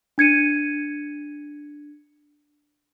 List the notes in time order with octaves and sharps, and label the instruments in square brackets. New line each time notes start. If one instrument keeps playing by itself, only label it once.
[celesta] D4 G#6 C#7 D#7